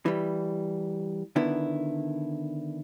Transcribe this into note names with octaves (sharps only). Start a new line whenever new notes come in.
E3 G3
D3 D#3 B3 E4